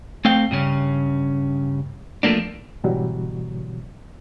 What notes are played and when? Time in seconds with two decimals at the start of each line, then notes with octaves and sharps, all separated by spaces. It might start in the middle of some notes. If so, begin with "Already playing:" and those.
0.25 A3 C4 F5 G5
0.51 G2 C#3 C#4
2.23 F3 A3 A#3 D4
2.84 G#2 B2 D3 E3 F#3 G3